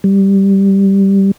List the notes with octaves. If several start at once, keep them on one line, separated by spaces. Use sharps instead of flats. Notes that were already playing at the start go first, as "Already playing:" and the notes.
G3